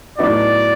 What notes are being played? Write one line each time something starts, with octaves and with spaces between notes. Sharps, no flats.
A2 F#3 B3 D#4 F#4 D5